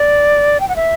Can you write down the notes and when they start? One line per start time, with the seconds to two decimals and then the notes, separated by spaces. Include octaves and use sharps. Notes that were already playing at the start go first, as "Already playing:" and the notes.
Already playing: D5
0.60 G5
0.69 F#5
0.76 E5